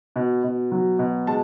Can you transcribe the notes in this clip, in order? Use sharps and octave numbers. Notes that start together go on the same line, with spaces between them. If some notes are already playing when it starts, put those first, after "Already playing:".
B2
B2
F#3
B2
G#3 A5